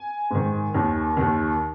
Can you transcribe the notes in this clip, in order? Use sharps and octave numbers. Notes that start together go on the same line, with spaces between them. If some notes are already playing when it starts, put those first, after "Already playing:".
Already playing: G#5
G#2 D#3
D#2 D#3
D#2 D#3